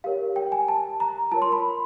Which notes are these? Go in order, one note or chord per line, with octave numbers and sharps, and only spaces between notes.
G4 A#4 C#5 F5
G5
G#5
A5
A#5
F4 A#4 C#5 A5
C6
B5